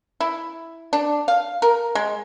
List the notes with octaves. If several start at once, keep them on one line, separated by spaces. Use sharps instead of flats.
E4
D4
F5
A#4
G#3